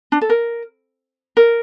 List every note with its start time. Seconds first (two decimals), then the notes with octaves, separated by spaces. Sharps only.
0.12 D4
0.21 A4
0.30 A#4
1.37 A#4